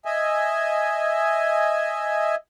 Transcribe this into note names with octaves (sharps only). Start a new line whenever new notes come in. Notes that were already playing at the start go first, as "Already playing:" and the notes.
D#5 E5 G#5